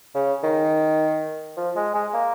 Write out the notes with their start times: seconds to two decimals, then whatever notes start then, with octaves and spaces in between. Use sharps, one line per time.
0.15 C#3
0.43 D#3
1.57 F3
1.76 G#3
1.94 G#3
2.14 A#3